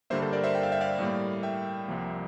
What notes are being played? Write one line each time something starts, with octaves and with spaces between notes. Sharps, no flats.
G2 D3 G3 A#3 C5 E5
A4 C5
A#4 D5
C5 E5
G5
F5
E5
D5 F5
A2 G3 A#3
E5 G5
C2 C3 F3 A#3